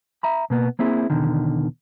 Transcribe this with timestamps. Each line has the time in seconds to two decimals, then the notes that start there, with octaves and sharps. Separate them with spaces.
0.23 E5 A#5 B5
0.50 B2 A#3 B3
0.79 A#3 C4 E4 G#4
1.10 E2 B2 D3 D#3